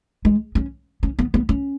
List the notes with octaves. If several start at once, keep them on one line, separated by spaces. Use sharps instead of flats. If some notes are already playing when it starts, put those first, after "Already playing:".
G#3
C#4
C#4
B3
B3
C#4